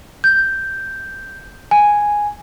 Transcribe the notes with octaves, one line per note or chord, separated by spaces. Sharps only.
G6
G#5